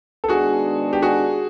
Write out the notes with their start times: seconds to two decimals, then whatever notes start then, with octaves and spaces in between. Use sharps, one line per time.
0.24 A4
0.28 D#3 G#3 B3 D4 F#4 G#4
0.93 G4
1.02 F#4 G#4